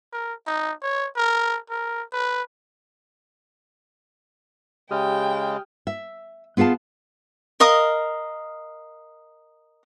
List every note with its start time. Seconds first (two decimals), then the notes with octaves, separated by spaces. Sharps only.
0.13 A#4
0.47 D#4
0.82 C#5
1.16 A#4
1.70 A#4
2.12 B4
4.91 C#3 G#3 G4 G5 D#6 F6
5.87 E5
6.57 B3 F4 G#4 F5 A5
7.60 A#4 D#5 F5 D#6